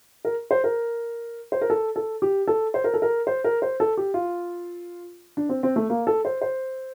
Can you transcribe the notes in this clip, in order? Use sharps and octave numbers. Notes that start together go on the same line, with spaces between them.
A#4
C5
A#4
C5
A#4
A4
A4
G4
A4
C5
A#4
A4
A#4
C5
A#4
C5
A4
G4
F4
D4
C4
C4
A3
A#3
A4
C5
C5